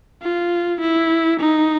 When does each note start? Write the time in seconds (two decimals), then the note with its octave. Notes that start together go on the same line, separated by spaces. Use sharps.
0.22 F4
0.81 E4
1.40 D#4